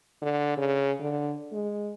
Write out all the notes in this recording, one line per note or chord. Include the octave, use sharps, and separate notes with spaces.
D3
C#3
D3
G#3